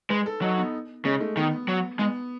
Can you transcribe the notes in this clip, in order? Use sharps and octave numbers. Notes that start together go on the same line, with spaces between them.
G#3 B4
A4
F#3 D#4
B3
C#3 G#3
A3
D#3 B3
F#3
G#3 B3